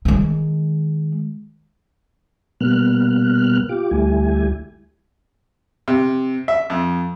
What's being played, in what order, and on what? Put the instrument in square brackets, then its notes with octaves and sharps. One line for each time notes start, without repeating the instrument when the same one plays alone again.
[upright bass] D#3 G#3
[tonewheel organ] B2 G3 A#3 B3 F6 F#6
F4 G4 D6
D2 G3 A3 E4 G4 G#5
[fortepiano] C3
E5
F2